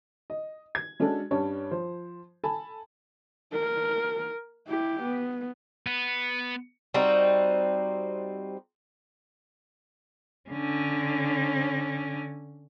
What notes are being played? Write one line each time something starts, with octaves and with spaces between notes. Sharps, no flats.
D#5
G#6
G#3 C#4 D4 F#4 A4
G2 G3 C#4 C#5 A5
F3 C5
A4 G#5 A5 B5
A#4
E4 G4
B3
B3
G3 C4 D#4 F#4
D3 C#4